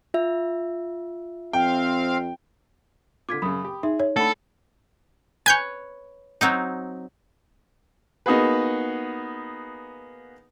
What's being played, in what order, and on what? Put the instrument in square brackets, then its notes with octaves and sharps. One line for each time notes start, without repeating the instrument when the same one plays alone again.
[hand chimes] F4 E5
[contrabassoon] F2 [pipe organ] C4 F5 [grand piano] G5
[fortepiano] D3 F4 [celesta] D6 G#6 B6
[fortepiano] F#2 C#3 [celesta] B5 D#6
[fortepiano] G4
[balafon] D#4 [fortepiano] G#4 [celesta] E5
[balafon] C#5
[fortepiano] A3 D4 [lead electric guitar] A4 [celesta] F#5 B5
[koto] B4 C#5 [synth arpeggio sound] G#5 G6
[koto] F#3 C4 D#4
[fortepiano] A#3 B3 D#4 F#4 G#4 B4